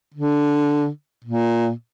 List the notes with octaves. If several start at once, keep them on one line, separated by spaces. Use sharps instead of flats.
D3
A#2